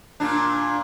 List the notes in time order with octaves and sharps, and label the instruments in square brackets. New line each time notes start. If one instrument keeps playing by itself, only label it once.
[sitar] A#2 D4